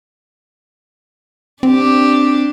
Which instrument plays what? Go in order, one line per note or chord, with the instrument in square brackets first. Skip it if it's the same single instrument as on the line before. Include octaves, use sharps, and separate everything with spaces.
[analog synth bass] C4 [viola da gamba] D4 G4